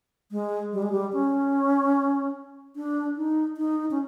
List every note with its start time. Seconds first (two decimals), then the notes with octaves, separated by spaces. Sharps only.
0.32 G#3
0.73 G3
0.82 G#3
0.92 G3
1.13 C#4
2.76 D4
3.17 D#4
3.57 D#4
3.91 C#4